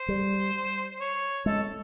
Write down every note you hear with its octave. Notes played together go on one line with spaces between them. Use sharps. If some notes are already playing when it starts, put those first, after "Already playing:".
Already playing: C5
G3
C#5
G#3 A4